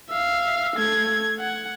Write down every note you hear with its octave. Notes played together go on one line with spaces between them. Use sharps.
E5 F5
A3 G#6
F#5